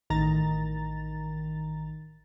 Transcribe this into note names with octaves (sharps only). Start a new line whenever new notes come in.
A1 D#3 A#5 A6